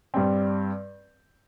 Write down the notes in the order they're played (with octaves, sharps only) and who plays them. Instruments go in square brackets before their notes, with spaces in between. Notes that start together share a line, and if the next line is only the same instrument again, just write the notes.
[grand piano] G2 G3 C4